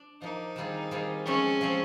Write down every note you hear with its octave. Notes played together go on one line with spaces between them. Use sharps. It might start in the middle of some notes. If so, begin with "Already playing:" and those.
Already playing: D4
F3 A#3 D4 D#4
D#3 G3 C4 F4 G#4
D#3 G3 C4 F4 G#4
F3 G#3 C4 C#4
F3 G#3 C4